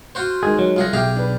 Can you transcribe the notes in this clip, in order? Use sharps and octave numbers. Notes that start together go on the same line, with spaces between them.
F4 F#4 C5
D#3 G#3 G#4
F#3
C2 F4 G#4 F#5 A#6
B1 G4 G#4 E5 F5 G5
D4 B4